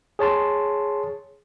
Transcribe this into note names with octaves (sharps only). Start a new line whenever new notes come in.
G#4 C#5 A5 C6